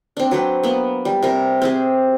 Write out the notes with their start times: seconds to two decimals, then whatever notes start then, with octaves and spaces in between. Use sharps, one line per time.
0.17 C4 D4
0.31 F#3 C4 B4
0.63 A#3 B3
1.05 G3
1.23 C3 A#4
1.62 C4 G4 G#4